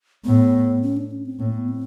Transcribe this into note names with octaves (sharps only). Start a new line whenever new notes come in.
A2 B3
C#4
D4
C#4
C4
A2 A#3
B3
C4